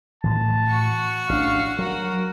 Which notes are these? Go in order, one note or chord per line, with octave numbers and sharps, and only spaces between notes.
A2 E3 A5
F#4 C#6
A1 D4 F5
F#3 F#4 A#4